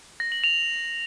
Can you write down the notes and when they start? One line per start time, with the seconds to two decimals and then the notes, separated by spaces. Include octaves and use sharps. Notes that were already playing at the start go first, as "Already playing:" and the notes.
0.20 A#6
0.32 F#7
0.44 F7